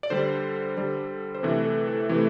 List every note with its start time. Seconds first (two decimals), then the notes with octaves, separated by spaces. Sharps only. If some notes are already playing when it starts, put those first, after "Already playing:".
0.03 D5
0.10 D3 G3 C5
0.77 D3 G3
1.35 C5
1.43 C3 E3 A3 A4
1.65 A4
1.87 A4
2.09 C3 E3 A3 A4